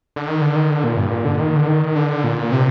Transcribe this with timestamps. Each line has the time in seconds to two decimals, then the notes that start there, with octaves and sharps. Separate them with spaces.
0.16 D3
0.28 D#3
0.41 D3
0.56 D#3
0.70 D3
0.84 A#2
0.97 G2
1.12 A#2
1.25 D3
1.40 D#3
1.56 D3
1.68 D#3
1.96 D3
2.24 A#2
2.52 C3